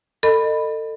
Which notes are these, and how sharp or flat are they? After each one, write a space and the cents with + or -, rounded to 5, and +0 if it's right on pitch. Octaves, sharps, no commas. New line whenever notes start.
A4 +30 D#5 -30 B5 +0